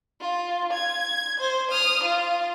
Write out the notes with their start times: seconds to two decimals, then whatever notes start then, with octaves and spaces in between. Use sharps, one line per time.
0.21 F4
0.73 G#6
1.40 C5
1.71 D#6 F6
2.04 F4